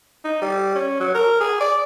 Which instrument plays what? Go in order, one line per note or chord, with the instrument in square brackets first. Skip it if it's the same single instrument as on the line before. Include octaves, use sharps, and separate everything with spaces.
[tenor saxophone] D#4
G3
C#4
F#3
A#4
G#4
D5